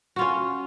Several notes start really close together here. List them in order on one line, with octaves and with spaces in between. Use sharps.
F#4 F4 C#4